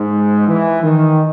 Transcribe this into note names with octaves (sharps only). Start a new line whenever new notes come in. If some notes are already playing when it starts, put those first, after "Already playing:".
Already playing: G#2
E3
D#3